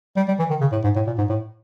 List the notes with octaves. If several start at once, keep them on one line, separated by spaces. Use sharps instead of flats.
G3
G3
E3
D#3
C#3
A2
G#2
A2
A#2
G#2
A2